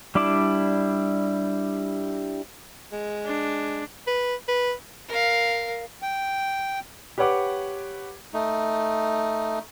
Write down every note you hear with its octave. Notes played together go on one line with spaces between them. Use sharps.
G3 D4 E4 D6
G#3
D4
B4
B4
A#4 F5
G5
G4 B4 C#5 F#5 D6
A3 D#4